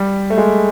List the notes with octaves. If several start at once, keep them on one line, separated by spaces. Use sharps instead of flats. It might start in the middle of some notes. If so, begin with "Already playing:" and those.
Already playing: G3
A3
G#3